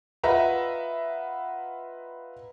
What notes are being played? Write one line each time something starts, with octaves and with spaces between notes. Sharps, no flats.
F4 B4 D#5 E5 F#5 A#5